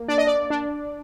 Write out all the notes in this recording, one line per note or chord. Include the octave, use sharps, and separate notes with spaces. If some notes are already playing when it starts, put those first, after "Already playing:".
Already playing: A#3
D4 D5
D#5
D5
D4